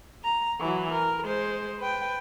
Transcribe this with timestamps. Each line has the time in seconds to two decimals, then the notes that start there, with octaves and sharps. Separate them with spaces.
0.24 A#5
0.60 E3 F#3
0.92 A#4
1.24 G#3 C5
1.79 B4 G5